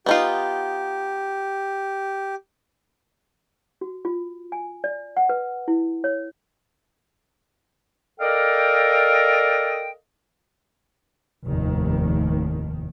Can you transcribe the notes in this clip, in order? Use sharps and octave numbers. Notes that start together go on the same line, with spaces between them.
B3 D#4 F4 G4
F#4
F4
G#5
D5
F#5
B4
E4
C#5
A4 A#4 D5 D#5 F5 G5
F1 D#2 A2 D#3